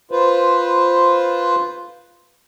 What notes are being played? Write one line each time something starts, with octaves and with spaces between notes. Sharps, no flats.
F4 B4 C5